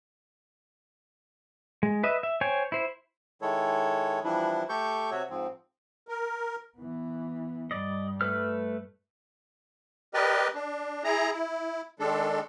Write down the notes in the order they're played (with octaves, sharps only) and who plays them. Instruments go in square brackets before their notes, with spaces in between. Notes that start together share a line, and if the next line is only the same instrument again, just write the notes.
[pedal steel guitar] G#3
B4 D#5 E5
E5
C5 C#5 G5 G#5
E4 C5
[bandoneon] D#3 G#3 E4 A4 C#5
E3 F3 G3 D4 E4
A3 G4 A4 C#6 G6
C3 F#4 C#5 E5
G#2 F3 C4
[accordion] A#4
[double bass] E3 B3
[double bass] G2 G3 [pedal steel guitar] D5 D#5
[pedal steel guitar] A3 B4 F6
[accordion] G4 A#4 B4 D5 D#5
D4
E4 G#4 A#5
E4
D#3 G#3 D4 A4